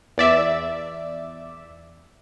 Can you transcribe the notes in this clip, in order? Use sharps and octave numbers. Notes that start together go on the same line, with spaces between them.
E2 D5 E5